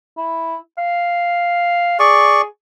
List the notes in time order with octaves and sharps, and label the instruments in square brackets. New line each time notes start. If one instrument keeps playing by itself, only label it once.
[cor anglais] E4
F5
[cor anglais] G#4 [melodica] D5 C#6